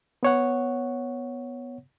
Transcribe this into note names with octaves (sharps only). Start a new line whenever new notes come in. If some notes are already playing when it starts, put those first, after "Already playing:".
B3 C#5 F#5